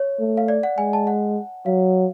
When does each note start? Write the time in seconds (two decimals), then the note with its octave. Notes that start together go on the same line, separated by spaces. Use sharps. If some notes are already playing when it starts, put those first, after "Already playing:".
Already playing: C#5
0.20 A3
0.37 F5
0.48 D5
0.63 F#5
0.78 G#3 G#5
0.93 A5
1.07 F#5
1.66 F#3 F5